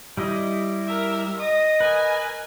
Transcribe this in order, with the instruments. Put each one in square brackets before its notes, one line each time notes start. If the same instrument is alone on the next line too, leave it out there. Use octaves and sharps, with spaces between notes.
[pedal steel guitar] G3 E4 D#5
[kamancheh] A#4 E5
[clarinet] D#5 [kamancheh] D#6
[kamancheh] A#4 G#5 [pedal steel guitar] B4